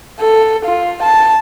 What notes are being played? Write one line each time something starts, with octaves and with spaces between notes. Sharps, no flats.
A4
F4
A5